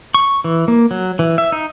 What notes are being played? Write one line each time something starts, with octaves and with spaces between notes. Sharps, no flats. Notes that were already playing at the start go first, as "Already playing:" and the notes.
C#6
E3
A#3
F#3
E3
E5
D#4